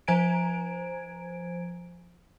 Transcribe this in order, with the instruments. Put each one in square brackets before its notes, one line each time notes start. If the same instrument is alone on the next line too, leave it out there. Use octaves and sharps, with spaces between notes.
[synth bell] F3 C5 G#5 A#5 G#6 D7